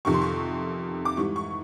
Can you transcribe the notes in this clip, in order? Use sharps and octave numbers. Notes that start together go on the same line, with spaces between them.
F2 C3 D#3 C#6
C6
C#6
D6
G#2 E3 G3 C#6
C#6